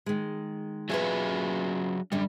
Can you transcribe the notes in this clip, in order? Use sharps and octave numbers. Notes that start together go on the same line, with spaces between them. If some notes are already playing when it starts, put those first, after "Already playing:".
D#3 G#3
F#3 C#4 F4 G#4 B4 E5
F#2 D3 G3